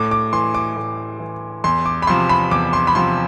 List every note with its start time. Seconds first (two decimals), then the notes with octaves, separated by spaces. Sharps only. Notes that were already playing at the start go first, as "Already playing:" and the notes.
Already playing: A2 D6
0.11 D6
0.33 E3 C6
0.54 D6
0.76 A2
1.20 E3
1.64 E2 C6
1.86 D6
2.02 B5
2.07 C3 F3 C6
2.29 B5
2.51 E2 D6
2.73 C6
2.87 B5
2.95 C3 F3 C6